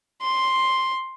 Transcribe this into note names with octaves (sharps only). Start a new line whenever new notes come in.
C6